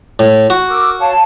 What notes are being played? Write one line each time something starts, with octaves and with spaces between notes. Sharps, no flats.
A2
F#4
A#4 D6 E6
C#5 F5 A5